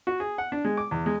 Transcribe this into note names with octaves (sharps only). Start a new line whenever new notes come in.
F#4
G#4
F#5
D4
G#3
D6
E2
G#3